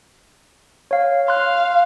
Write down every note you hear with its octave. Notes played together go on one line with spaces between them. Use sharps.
C#5 F5
F5 C6 F#6